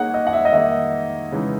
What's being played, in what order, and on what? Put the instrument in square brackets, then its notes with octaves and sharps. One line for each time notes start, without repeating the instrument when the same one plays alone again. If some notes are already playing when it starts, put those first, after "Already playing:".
Already playing: [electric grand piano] A#3 D#4 G#4 C#5 [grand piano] F#5
[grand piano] D#5
F#5
E5
D#5
[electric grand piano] D#3 A#3 D#4 G#4 [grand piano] E5
[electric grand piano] C#3 E3 G#3 D#4